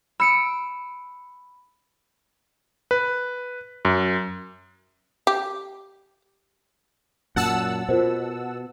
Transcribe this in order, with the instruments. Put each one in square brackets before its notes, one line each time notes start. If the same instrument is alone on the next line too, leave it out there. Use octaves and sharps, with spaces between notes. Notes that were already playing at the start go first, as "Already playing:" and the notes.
[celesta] B5 [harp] E6 C#7 D7
[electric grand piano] B4
F#2
[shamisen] G4
[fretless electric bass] F#2 A#2 [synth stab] F#5 A5 E6
[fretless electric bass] B2 [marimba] F4 A#4 C5